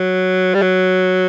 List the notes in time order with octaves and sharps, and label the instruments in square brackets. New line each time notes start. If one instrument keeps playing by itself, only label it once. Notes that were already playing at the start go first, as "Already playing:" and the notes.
Already playing: [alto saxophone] F#3
G3
F#3